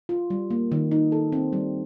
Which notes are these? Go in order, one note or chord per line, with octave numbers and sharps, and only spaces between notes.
F4
G3
A#3
D#3
D#4
A4
C4
G3